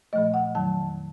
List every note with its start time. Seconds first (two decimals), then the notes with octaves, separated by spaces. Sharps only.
0.13 A#2 F3 A3 D#5
0.34 F#5
0.55 F2 D#3 F#3 A5